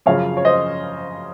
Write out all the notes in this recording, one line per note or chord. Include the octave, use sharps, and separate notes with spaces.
F#2 C#3 F3 C#5 F5
C#5
C5 D#5